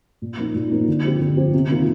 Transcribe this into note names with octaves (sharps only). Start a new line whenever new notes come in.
A#2
F3 A#3 D#4
A#2
F3 A#3 D#4
D3
F3 C4 G4
D3
F3 C4 G4
C3
D#3 A#3 F4